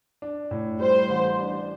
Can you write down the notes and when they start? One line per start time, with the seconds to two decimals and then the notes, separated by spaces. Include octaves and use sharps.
0.22 D4
0.51 A2
0.80 G3 C5
1.09 A1
1.39 D4